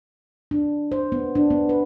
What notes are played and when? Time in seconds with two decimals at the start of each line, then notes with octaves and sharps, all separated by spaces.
0.51 D4
0.92 C5
1.12 B3
1.35 D4
1.50 B3
1.69 B4